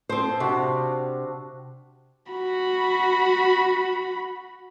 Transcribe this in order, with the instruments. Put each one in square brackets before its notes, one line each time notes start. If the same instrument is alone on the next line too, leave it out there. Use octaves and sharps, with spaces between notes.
[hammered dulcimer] F3 C6 [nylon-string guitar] C4 C5
[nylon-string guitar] C3 [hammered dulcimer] D4 F#4 F5
[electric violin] F#4 B5